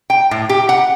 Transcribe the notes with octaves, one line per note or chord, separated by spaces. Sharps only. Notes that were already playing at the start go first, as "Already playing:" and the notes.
G5
A2
G4
F#5